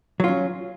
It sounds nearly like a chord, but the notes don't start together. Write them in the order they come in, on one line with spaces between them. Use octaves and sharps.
F#3 F4 C#4